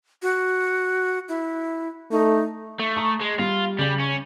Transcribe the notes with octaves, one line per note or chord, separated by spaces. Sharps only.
F#4
E4
A3 D#4
A3
A#5 C#6 D#6
G#3
G3 F4
C#3 G3 F#7
C#4